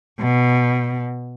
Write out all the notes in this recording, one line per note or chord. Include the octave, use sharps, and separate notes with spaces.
B2